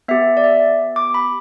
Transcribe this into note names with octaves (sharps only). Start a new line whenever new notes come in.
B3 G4 E5
D5
E5
D6
B5